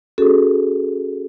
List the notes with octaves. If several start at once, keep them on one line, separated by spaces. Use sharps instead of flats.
C#4 F#4 G#4 A4